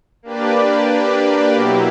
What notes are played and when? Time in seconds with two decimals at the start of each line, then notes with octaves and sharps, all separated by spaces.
0.23 A#3 D4 G4 B4 D5
1.53 B2 F#3 A#3 E4 G4